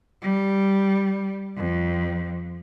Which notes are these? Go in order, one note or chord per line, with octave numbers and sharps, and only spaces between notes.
G3
F2